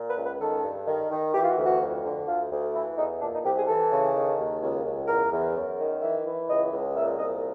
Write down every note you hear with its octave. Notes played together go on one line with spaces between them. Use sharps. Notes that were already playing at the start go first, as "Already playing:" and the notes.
Already playing: A#2
B4
C#2
B4
D#3 A4
G2
D#3
D#3
E3 G4
F4
F#4
D2
F#4
F2
D3
D2 F4
D2
E3 E4
E2 D#4
A#2 D4
D#4
C2 G4
G#4
E3 A4
C#3
D#3
D#2
C#2
C#2
E2 A#4
E2
F#2
D#3
E3 E5
E3
C#2 D#5
C#2
A#2 E5
C2 D#5